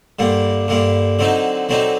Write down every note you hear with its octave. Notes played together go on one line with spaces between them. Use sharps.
G2 D3 G3 A#3
G2 D3 G3 A#3
D3 F#3 C4 D#4
D3 F#3 C4 D#4